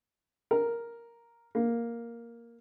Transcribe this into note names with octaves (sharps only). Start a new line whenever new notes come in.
A#4
A#3